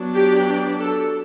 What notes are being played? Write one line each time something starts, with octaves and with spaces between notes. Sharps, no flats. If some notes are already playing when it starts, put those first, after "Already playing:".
Already playing: F#3 B3 D4
G4
A4